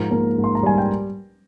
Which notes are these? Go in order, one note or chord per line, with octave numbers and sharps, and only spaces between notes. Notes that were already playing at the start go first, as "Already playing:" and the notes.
Already playing: G#2 F3 A#4 A#5
A#3
G#2
C6
A#5
G3 G#5
G5